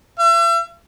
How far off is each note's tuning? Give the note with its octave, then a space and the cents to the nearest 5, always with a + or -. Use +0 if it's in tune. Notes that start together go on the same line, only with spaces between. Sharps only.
E5 +40